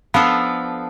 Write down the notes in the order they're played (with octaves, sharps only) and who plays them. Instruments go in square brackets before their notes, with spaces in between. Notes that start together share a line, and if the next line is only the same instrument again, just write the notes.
[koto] F3 B3 D4 F4 A4